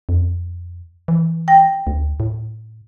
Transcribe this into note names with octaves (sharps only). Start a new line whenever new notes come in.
F2
E3
G5 A#6
D2
A2